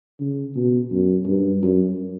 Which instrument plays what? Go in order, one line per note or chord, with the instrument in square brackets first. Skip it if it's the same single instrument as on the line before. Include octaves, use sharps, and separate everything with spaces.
[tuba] C#3
B2
F#2
G2
F#2